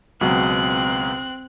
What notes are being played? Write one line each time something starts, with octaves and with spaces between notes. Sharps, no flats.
C#2 B2 F#3 C4 F#6